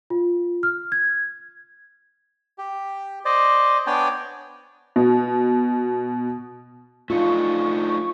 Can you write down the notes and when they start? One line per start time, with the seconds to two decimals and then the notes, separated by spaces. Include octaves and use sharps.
0.10 F4
0.63 F6
0.92 G#6
2.58 G4
3.25 C5 D5 D#5
3.87 B3 D4 C#5 D5 G5 G#5
4.96 B2
7.10 A3 D4 D#4 F4 C#6